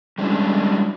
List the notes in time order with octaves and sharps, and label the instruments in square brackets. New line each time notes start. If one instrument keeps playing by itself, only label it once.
[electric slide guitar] G3 G#3 C#4 D4 E4 F#4